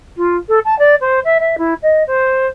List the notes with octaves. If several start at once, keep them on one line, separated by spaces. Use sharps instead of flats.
F4
A4
A5
D5
C5
E5
E5
E4
D#5
C5